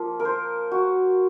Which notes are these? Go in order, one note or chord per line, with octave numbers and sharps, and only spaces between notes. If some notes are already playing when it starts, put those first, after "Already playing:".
Already playing: F3 A#3 F4
A#4
C5
F#4